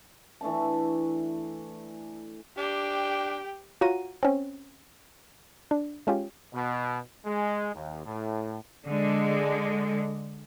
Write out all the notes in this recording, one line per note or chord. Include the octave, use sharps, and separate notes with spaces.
E3 A3 D4 A5
D4 G4 G5
F4 F#4 C#5 F#5 A#5 D#7
C4 C#4
D4
G#3 C#4 F4 G4
B2
G#3
D#2
A2
D3 G#3